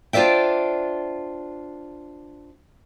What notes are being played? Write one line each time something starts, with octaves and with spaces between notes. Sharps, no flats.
D4 F4 C5 D5 E5 G5